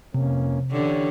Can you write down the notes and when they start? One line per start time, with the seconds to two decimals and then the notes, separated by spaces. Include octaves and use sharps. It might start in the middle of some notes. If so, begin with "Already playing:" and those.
0.14 F2 C3 A#3 C#4
0.71 D3 E3 C#4 G4 C#5 D5